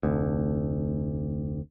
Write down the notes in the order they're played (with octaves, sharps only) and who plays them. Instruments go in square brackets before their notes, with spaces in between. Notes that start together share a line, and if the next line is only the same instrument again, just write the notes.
[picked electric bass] F1 D2